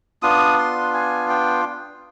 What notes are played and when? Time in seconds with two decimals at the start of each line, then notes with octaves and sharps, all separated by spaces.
0.22 B3 D4 F4 D#6
0.58 C6
0.94 G#5
1.30 G5